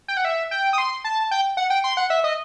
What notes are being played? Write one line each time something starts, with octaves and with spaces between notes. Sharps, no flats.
G5
F#5
E5
G5
D#6
C6
A5
G5
F#5
G5
C6
F#5
E5
D#5